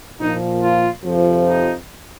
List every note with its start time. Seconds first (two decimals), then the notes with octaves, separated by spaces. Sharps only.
0.20 A#2 F3 D#4
0.63 F4
1.05 F2 C3 F3
1.47 D#4